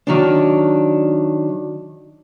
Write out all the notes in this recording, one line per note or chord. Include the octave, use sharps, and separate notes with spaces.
D#3 F#3 D4